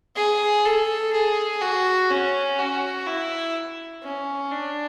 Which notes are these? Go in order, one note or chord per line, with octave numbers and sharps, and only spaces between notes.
G#4
A4
G#4
F#4
C#4
F#4
E4
C#4
D4